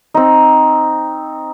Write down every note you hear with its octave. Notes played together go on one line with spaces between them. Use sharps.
C4 D#4